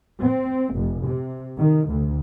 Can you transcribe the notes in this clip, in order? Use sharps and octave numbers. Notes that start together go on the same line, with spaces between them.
C4
F1
C3
D#3
D2